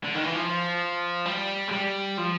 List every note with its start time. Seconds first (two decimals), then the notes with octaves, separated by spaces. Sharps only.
0.04 D3
0.15 D#3
0.24 E3
0.34 F3
1.26 G3
1.68 G#3
1.71 G3
2.18 F3